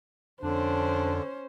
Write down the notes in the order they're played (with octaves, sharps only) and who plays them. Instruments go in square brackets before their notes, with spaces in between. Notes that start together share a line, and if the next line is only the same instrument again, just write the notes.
[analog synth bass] F2 [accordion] D3 [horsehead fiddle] C#4 C5 [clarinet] D4